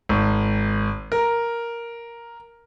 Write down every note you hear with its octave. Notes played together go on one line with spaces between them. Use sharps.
G#1
A#4